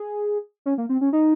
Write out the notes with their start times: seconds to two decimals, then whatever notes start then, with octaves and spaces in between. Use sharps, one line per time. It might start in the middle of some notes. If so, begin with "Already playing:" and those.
Already playing: G#4
0.66 C#4
0.78 A#3
0.89 C4
1.01 C#4
1.13 D#4